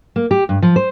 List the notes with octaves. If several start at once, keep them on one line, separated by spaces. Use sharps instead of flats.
A#3
G4
G2
F3
C5